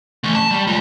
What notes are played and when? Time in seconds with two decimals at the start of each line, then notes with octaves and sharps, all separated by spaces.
0.24 E3 A3
0.35 A5
0.51 G3
0.67 G#3 F4